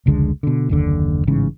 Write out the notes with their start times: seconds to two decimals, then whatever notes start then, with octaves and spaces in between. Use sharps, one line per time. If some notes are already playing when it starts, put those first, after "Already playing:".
0.06 F1 C#2 D3 G#3
0.43 B2 D3
0.69 F#1 D#2 D3
1.27 A1 G#2 C#3 E3